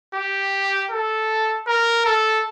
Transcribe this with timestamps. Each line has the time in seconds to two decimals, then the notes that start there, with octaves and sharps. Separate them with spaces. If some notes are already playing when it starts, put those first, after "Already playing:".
0.15 G4
0.91 A4
1.67 A#4
2.05 A4